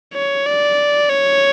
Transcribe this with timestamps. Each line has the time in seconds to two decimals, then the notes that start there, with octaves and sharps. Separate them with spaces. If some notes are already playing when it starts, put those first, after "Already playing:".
0.14 C#5
0.46 D5
1.09 C#5